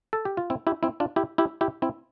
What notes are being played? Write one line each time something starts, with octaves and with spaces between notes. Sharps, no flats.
A4
G4
F4
C4 E4
E4 G4
C4 E4
D4 F4
E4 G4
E4 G4
E4 G4
C4 E4